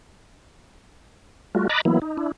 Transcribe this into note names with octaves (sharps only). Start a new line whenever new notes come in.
G3 A3 F4 F#4
D#5 A#5 B5 D6 F#6 A6
E3 F#3 A#3 B3 E4
D#4
D4 E4